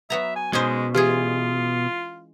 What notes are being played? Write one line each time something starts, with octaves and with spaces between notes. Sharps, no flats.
F#3 B3 E5 A#5
G#5
B2 G#3 C#4 D#4 C5
E3 G#3 F4 G4 G#4